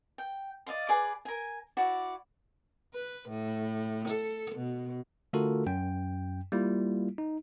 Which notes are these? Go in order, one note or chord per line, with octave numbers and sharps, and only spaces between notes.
G5
D5 D#5 F5 C6
G#4 B4 D5 D6
A#4 G#5
E4 F#4 D5
B4
A2
A4
B2
D3 A3 F4 F#4 A4 A#4
F#2 G5
G3 A#3 E4 F4
D#4